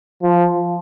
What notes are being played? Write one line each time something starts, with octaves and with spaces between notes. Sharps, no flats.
F3